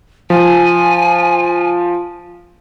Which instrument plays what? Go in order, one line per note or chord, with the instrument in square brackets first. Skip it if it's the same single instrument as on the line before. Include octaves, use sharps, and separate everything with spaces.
[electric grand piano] F3 [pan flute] G#5